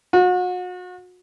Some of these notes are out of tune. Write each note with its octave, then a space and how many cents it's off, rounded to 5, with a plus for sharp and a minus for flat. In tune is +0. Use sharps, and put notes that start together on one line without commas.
F#4 -35